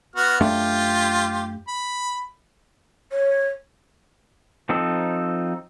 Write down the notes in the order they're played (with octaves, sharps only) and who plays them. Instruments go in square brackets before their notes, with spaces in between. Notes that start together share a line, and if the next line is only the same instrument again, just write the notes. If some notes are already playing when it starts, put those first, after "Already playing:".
[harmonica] B3 F#4 F6
[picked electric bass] F#2 A3 D4 [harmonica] F4 G4
[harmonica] B5
[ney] C#5
[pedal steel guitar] F3 C4 D#4 A4